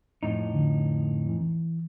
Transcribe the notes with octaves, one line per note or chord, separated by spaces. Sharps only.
F2 A2 D#4
D3
E3